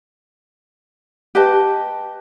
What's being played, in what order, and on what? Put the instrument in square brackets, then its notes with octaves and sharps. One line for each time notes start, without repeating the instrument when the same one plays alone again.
[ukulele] G4 B4 D#5 A5